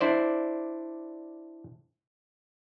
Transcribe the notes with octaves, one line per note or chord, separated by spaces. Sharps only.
D4 E4 C5 D5